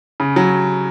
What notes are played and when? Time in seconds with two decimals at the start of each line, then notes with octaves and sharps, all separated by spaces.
0.20 C#3
0.36 F#3